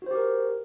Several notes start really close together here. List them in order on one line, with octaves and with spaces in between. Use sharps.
F#4 C5 G4 A#4